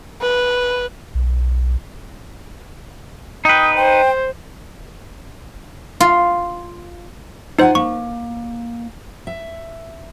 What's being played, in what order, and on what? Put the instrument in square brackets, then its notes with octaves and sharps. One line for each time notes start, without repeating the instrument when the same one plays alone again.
[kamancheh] B4
[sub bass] B1
[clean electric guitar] D#4 B4 [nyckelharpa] G5 [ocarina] D#6
[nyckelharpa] C5 [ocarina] G5
[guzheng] F4
[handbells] D#4 C5 [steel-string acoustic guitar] F4 F#5 G#5
[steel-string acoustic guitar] A#3 [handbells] C#6
[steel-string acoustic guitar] E5